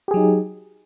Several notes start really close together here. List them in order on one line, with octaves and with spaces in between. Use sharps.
G4 G#4 F#3 D#4